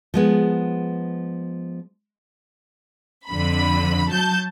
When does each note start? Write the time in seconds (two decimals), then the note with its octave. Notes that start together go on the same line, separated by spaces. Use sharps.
0.14 F3 G#3 B3
3.28 F2 D3 B5
4.09 F#3 A5 G6